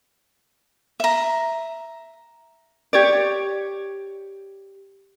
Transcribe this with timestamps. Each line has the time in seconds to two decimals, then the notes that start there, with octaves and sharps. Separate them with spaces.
1.00 E5 A#5
2.93 G4 C#5 D5